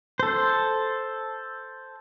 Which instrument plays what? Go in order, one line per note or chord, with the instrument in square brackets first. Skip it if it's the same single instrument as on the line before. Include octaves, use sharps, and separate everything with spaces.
[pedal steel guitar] A4 C5